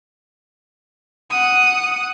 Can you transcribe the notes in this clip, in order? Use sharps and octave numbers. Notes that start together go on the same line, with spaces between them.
F#5 D#6